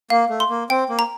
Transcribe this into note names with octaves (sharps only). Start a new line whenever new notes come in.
A#3 F5
A3
C6
A#3
C4 G5
A#3
A#5